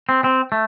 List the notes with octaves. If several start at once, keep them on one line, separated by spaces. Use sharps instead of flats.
C4
C4
A3